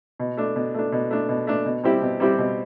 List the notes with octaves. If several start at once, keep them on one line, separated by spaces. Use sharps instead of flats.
B2
A3 D4
B2
A3 D4
B2
A3 D4
B2
A3 D4
B2
G3 C4 E4 G4
B2
G3 C4 E4 G4
B2